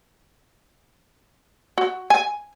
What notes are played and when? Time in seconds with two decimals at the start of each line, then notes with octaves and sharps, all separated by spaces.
1.78 F#4
2.10 G#5